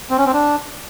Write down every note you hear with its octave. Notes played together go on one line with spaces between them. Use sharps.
C4
C#4
C4
D4